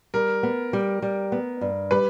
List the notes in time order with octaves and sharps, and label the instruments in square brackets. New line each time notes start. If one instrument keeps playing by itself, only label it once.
[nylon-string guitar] G3 [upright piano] A#4
[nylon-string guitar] B3
G3
G3
B3
G2
[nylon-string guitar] G3 [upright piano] B4